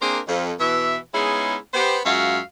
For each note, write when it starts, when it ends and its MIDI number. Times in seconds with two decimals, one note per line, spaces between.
0.01 0.19 58
0.01 0.19 60
0.01 0.19 62
0.01 0.19 68
0.01 0.19 70
0.01 0.19 72
0.28 0.51 41
0.59 0.97 47
0.59 0.97 52
0.59 0.97 76
1.14 1.56 56
1.14 1.56 59
1.14 1.56 61
1.14 1.56 63
1.14 1.56 64
1.14 1.56 68
1.74 1.99 59
1.74 1.99 67
1.74 1.99 72
2.05 2.39 42
2.05 2.39 56
2.05 2.39 65
2.05 2.39 66
2.05 2.39 76
2.05 2.39 77